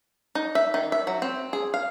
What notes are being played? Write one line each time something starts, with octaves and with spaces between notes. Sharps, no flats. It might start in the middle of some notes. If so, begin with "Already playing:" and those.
D#4
E5
D#3
E5
F#3
C4
G#4
F5